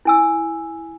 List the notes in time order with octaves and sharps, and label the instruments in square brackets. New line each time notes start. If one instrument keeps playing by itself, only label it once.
[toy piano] E4 G#5 E6